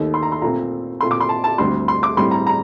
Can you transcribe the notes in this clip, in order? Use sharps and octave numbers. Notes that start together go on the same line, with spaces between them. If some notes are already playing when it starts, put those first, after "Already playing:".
Already playing: D#2 D#3 A3
C6
A#5
C6
A#2 A3 C4 A#5
A#2 A3 C4 C6
D6
C6
A5
A5
D2 D3 G3 C4 C6
C6
D6
A2 G3 C4 C6
A#5
A#5